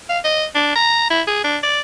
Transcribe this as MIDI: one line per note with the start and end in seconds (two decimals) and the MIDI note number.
0.09 0.19 77
0.24 0.45 75
0.55 0.74 62
0.76 1.06 82
1.10 1.22 64
1.28 1.42 68
1.44 1.58 62
1.63 1.81 74